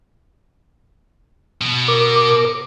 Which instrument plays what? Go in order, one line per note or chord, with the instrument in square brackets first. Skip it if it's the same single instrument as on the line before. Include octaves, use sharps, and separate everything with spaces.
[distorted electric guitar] B2
[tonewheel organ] A#4 D6